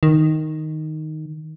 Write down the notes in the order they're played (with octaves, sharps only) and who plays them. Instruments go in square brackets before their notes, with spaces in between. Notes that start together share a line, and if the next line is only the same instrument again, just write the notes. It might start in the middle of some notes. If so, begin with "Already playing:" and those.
[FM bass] D#3